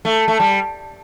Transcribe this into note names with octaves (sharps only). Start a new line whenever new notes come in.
A3
A3
G3